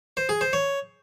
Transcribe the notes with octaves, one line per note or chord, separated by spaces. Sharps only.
C5
G#4
C5
C#5